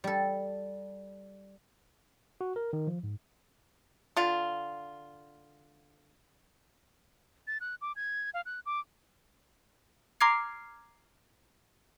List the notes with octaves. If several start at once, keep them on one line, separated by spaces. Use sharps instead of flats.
G3 A4
F#4
A#4
D#3
F3
G#2
D3 F4
A6
F#6
D6
G#6
F5
F#6
D6
A#5 C6 D6 F6 G#6 C7